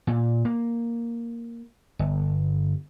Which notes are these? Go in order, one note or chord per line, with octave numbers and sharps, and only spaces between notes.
A#2
A#3
G1